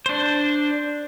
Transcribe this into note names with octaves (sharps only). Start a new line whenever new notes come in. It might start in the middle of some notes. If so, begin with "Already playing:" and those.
D4 C5